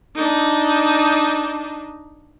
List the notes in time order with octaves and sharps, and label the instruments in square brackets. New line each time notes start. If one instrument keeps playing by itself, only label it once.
[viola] D4 D#4